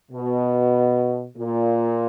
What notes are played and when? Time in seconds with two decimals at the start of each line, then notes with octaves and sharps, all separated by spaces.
0.12 B2
1.37 A#2